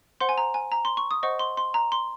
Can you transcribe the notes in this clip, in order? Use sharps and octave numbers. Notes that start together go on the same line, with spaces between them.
C5 F#5 C6
G#5
A#5
G#5
A#5
C6
C#6
D#6
C5 D#5 F#5 C#6
C6
C6
A#5
C6